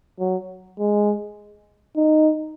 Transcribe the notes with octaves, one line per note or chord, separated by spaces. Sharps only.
F#3
G#3
D#4